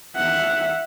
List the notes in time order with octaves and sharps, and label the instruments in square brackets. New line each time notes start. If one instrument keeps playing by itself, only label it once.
[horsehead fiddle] E5 F#5